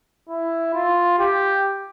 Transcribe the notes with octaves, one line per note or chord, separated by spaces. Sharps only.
E4
F4
G4